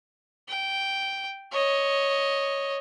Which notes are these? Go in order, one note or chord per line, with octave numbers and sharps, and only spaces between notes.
G5
C#5 D#5